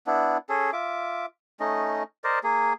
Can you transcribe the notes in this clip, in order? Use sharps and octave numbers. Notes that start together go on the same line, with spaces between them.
B3 D4 E4
C#4 G#4 A4
F4 E5 D6
A3 C#4 D#4 D#5
A#4 C5 D5 D#5
A#3 G#4